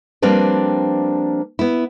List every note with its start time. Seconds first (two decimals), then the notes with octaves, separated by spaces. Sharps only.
0.22 F3 G3 A#3 C4 D4 B4
1.59 B3 E4